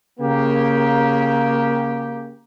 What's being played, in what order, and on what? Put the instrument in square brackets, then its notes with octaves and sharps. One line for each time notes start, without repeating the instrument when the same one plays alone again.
[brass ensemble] C#3 A#3 G4